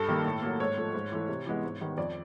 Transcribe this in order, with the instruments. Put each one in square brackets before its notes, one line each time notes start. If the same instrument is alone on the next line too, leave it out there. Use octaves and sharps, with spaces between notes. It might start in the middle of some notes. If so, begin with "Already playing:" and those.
Already playing: [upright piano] G2 A4
D#3 G3 A#3
A2
F#3 A#3
G#2 C#5
F3 A3
G#2
E3 A3
C3
E3 G#3 B3
G#2
D#3 G3 B3
F2 D5